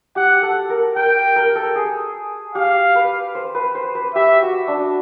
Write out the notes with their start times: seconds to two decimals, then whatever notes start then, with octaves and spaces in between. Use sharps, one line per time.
0.16 G4 F#5
0.42 A4
0.70 A#4
0.96 A#4 G5
1.36 A#4
1.55 A4
1.76 G#4
2.55 G4 F5
2.95 B4
3.35 C5
3.55 B4
3.75 C5
3.95 B4
4.15 G4 E5
4.42 F#4
4.68 D4